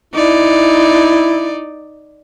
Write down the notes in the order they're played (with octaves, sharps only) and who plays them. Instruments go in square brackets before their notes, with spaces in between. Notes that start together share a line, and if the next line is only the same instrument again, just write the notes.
[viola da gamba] D#4 D5 [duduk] E4